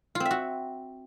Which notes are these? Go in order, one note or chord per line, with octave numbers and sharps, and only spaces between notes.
F4
C4
E5
F#4